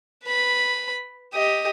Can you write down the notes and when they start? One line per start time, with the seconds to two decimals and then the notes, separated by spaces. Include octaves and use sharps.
0.25 B4 B5
1.34 G4 D#5